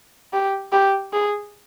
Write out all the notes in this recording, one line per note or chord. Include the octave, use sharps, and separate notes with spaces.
G4
G4
G#4